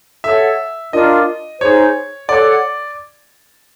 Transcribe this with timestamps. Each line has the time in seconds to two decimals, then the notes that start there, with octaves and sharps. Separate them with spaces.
0.24 A4 C#5 E5 F#5
0.93 D4 F4 A#4 D5 D#5
1.61 D#4 G#4 C5 C#5
2.29 A4 C#5 D5 F#5